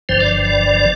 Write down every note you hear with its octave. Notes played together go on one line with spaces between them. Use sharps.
G1 G2 F3 C5
D5
D5